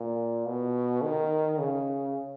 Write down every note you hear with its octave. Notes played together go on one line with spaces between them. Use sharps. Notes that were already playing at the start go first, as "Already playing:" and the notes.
Already playing: A#2
B2
D#3
C#3